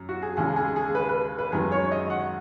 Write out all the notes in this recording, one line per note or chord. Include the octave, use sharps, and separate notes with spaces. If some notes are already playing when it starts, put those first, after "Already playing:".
Already playing: F#2
F#4
G#4
D#2 C#3 G#3 G#4
G#4
G#4
B4
B4
B4
F#2 D#3 G#3 G#4
C#5
C#5
D#5
F#5